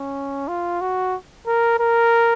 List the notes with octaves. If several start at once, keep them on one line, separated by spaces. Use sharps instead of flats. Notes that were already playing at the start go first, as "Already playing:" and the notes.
Already playing: C#4
F4
F#4
A#4
A#4